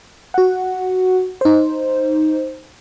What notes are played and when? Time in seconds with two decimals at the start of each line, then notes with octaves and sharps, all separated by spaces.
0.34 F#4 F#5
1.41 D#4 C5